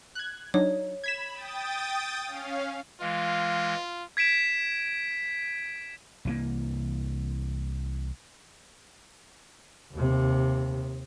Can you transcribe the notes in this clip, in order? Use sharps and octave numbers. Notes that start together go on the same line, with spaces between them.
F#6 G#6
F#3 D4 D#4 C#5
B5 G#6 B6 E7
G5 D#6 A6
C#4 F5
E3 G#3 F4 F5
G#6 B6 D7 E7
C2 E3 A#3
D#2 C3